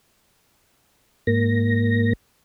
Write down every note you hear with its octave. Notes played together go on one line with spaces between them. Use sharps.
G#2 A#3 A#6